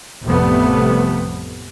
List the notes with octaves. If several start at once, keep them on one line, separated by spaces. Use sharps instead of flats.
A1 F2 C3 G3 A3 B3